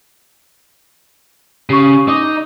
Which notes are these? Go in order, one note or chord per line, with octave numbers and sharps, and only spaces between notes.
C#3 G4 C#6
D#4 D6 D#6